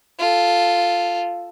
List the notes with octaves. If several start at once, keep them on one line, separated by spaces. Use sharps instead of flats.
F4 A4